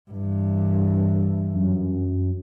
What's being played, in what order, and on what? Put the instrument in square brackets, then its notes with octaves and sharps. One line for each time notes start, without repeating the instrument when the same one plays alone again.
[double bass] G2 E3
[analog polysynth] F#2